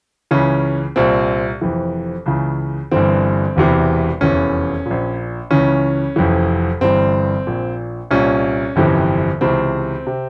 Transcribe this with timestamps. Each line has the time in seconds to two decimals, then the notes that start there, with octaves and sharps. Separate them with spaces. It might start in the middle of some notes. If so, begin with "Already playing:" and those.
0.31 C#2 C#3 E3 C#4
0.96 C2 A#2 C4
1.61 F1 F2 E3
2.26 C#2 C#3 E3
2.91 G1 G2 E3 C4
3.56 E1 E2 C3 E3
4.21 F1 E2 E3 C#4
4.86 A#1 A#2
5.51 C#2 C#3 E3 C#4
6.16 F1 F2 E3
6.81 G1 G2 E3 C4
7.47 A#1 A#2
8.11 C2 A#2 C#4
8.76 G1 F2 C3 E3
9.41 C#2 C3 E3 C4
10.07 C3